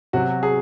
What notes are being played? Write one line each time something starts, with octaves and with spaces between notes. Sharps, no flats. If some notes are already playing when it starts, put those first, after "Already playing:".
C3 F#3 F#4
G#4